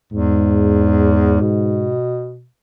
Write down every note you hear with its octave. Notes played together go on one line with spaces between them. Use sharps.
E2 G#2
B2